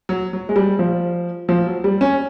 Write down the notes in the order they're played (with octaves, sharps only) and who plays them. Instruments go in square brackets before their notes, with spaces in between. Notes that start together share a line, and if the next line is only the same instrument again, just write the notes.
[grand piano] F#3
F#3
G#3
G3
F3
F3
F#3
G3
C#4